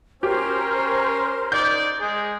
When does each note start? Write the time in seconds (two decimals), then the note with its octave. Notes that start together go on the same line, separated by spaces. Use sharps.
0.23 C#4 G4 A#4 C5
1.52 D#4 D5 G6
2.00 G#3 G#4